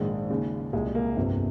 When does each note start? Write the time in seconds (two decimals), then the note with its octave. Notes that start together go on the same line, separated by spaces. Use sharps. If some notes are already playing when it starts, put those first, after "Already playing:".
Already playing: A#1 G#2 D#3 G#3
0.30 D#2 C#3
0.73 C2 A#2 G#3
0.95 A#3
1.17 G1 F2 C3